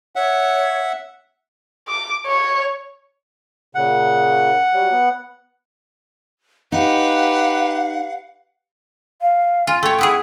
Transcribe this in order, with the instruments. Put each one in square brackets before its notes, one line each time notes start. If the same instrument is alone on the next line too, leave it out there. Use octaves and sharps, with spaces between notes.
[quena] C#5 [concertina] E5 F#5
[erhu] D6
C#5
[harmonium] A#2 C#3 [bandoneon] F#5
[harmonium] F#3 G3
B3
[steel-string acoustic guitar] D#4 [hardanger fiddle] G4 B4 [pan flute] F5 [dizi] F#5
[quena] F5
[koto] F4 [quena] G#5
[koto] A3 C#5 [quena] G5
[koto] B3 E4 G#4